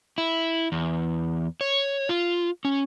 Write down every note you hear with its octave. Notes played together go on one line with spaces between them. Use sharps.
E4
E2
C#5
F4
C#4